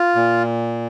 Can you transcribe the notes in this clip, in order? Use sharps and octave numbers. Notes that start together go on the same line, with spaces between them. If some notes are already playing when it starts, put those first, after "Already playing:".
Already playing: F4
A#2